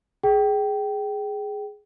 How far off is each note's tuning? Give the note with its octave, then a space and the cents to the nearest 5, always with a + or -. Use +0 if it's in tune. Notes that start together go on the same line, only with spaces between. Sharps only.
G#4 +5 G5 -20